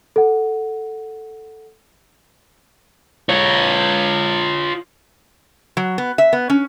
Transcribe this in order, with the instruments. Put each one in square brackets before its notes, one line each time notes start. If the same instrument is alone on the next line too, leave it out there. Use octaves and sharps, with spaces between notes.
[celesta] A4 F#5
[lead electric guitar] F4 C#5
[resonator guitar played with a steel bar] F#3
B3
E5
B3
C#4